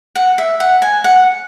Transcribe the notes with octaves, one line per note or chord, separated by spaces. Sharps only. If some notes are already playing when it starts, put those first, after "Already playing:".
F#5
E5
F#5
G#5
F#5